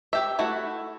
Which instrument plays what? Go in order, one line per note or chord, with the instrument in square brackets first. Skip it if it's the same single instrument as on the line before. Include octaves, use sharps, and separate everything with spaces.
[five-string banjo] G4 E5
A3 E4 F#4